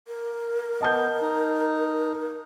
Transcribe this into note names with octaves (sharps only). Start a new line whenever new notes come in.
A#4
B3 D#5 A5 G6
D#4